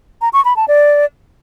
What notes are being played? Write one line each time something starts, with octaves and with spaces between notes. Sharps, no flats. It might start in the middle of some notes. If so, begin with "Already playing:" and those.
A#5
C#6
B5
A5
D5